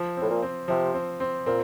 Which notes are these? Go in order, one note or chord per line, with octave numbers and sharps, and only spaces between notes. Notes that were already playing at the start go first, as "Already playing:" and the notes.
Already playing: F3
A2 C4
A#2
C4
C3 F3
C4
C4
A#2 C4